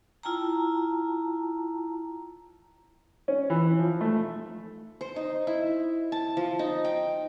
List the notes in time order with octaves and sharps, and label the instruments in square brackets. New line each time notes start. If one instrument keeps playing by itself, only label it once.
[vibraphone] E4 F4 G5 A5 A#5
[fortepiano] C#4
E3
F3
A3
[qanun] C5
D#4
E4
A5
F3
D#4
G5